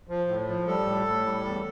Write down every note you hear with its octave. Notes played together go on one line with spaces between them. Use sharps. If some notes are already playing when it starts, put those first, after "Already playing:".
F3
A2
F3
G3 A4
A2
A2
G3
E2